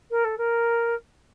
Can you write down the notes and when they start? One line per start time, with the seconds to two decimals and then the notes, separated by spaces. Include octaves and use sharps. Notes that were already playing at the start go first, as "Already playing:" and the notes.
0.11 A#4
0.24 A4
0.38 A#4